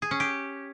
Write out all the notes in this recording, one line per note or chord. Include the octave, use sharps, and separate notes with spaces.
G#4
C#4
G4